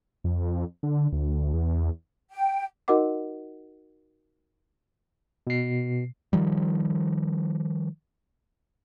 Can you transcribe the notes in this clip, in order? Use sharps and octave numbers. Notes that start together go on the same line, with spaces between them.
F2
D3
D2
E2
G5
D#4 F#4 A#4 D#5 F#5 D6
B2 C7
D#3 F3 G3